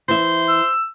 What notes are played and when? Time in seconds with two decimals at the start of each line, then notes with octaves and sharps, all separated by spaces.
0.08 E3 C5 E5
0.48 E6